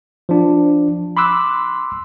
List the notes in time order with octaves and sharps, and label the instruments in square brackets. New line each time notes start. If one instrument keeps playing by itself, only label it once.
[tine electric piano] F3 D4
B5 C6 D6 E6 F#6